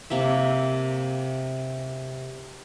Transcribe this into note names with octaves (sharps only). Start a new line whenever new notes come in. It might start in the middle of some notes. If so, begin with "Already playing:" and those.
C3 A#3 E5